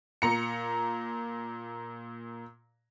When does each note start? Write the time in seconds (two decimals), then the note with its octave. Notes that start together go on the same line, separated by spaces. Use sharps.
0.22 A#2 A#5 C#7